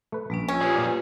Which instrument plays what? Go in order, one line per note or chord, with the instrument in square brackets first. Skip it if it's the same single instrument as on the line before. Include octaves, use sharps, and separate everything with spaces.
[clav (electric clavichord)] A3 B4
[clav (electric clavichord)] A#1 [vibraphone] G3 A#3 C#4
[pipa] C#4 [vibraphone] F4 E6
[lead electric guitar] F3 G#4 [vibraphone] F4 G4 B4
[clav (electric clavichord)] A#2 D5